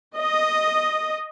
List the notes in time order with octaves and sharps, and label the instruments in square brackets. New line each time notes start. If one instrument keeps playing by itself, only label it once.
[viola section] D#5